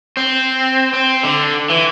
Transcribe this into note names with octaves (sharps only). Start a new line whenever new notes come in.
C4
C4
D3
E3